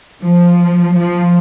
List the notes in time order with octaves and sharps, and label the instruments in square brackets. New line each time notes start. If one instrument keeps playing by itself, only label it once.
[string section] F3
F3